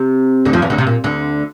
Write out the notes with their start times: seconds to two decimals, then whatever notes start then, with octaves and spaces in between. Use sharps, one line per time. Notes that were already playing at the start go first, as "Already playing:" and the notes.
Already playing: C3
0.45 D2 D3
0.53 F2 F3
0.62 E2 E3
0.70 D2 D3
0.78 C3
0.87 A#2
1.04 D2 D3